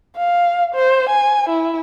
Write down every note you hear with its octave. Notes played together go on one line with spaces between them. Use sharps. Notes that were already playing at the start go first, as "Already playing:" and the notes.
F5
C5
G#5
E4